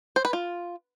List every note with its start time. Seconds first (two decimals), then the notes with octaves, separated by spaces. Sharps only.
0.16 C5
0.25 B4
0.33 F4